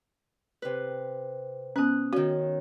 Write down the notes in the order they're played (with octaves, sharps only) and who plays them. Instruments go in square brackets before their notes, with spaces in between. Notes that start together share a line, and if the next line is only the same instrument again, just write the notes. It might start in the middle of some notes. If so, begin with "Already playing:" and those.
[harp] C3 B4
[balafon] B3 C#4 [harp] D#6 F#6
[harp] D#3 C#4 [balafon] F#4